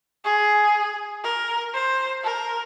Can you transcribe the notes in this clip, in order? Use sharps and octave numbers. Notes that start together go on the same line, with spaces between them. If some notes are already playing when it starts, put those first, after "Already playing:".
G#4
A#4
C5
A#4